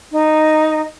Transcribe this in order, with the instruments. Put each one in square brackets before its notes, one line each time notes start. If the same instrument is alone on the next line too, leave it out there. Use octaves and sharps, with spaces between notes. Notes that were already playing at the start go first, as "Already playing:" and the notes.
[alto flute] D#4